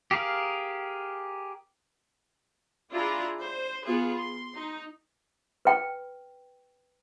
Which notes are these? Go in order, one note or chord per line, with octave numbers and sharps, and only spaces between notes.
G4 G#4 A#4 F5
D4 E4 F4 G#4 A#5 C6
C5
B3 F4 G#4
C6
D#4
B4 G5